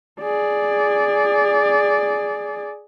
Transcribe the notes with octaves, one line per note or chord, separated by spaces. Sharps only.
G#4 D5